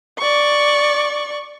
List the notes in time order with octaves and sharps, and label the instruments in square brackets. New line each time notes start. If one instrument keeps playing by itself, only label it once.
[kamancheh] D5 C#6